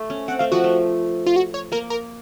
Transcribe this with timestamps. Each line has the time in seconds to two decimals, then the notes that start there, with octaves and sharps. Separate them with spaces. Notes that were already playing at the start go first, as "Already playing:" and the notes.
Already playing: A3
0.10 C#4
0.28 C4 F#5
0.39 A3 F5
0.52 F3 F#4
0.64 A3
1.27 F4
1.36 F#4
1.54 C#5
1.72 A#3 A#4
1.90 A#4